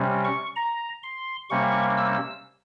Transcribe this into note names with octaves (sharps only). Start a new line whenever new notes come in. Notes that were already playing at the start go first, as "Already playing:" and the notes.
Already playing: C3 G3 C#4
C#6
A#5
C6
C3 G3 A#3 C#4 C#6
E6